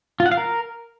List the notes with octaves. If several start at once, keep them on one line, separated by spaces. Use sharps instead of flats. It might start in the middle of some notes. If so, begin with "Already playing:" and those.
F4
F#5
F5
A#4